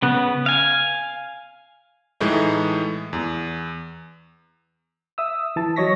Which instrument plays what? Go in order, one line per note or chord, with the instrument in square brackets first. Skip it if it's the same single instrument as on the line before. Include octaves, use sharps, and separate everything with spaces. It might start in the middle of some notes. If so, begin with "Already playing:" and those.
[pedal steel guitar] C#3 B3
F5 G#5
[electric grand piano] A2 E3 G#3 A3 D#4 E4
E2
[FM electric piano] E5 D#6 E6
E3 A5
F#3 C#5 D#5 C#6 A#6 B6